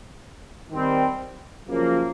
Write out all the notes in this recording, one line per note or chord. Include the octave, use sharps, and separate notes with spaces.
D#3 G3 C4
F#2 C#3 F3 A#3